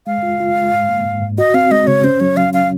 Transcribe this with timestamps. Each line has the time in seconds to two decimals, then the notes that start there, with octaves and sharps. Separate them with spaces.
0.06 G#3 F5
0.23 F4
0.40 F4
0.56 G#3
0.73 G#2
0.89 A#3
1.05 G#2
1.22 G#2
1.38 F#4 D#5
1.54 C4 F5
1.71 G#3 D#5
1.87 C#3 C#5
2.04 C#4 C5
2.20 F#3 C#5
2.36 F#3 F5
2.53 C#4 F5